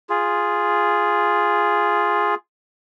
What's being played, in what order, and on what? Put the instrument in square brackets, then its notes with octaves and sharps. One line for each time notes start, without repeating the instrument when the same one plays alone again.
[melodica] F4 G#4